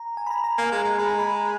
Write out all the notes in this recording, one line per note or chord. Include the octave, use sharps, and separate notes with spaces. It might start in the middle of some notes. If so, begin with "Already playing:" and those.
Already playing: A#5
G#5
B5
A#5
A#5
A#3 G#5
G#3
A#5
G#3
G#3 B5
A#5
B5